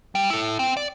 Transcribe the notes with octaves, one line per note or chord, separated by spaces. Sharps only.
G3
E4 A4
C4 G5
D5